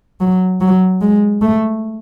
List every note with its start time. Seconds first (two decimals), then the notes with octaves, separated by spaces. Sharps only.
0.20 F#3
0.61 F#3
1.01 G#3
1.41 A3